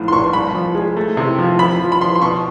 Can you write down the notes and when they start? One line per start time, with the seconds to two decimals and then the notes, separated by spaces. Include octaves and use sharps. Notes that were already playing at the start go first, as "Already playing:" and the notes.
Already playing: B1 A2 F3
0.08 C6
0.12 A#1 C#6
0.33 C2 B5
0.55 F3
0.75 G#3
0.97 A3
1.17 C3
1.39 F3
1.59 F3 B5
1.80 F3
1.92 B5
2.01 F3 C6
2.15 C6
2.22 B2 C#6